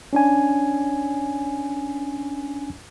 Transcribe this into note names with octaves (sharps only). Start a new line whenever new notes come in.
C#4 D4 G#5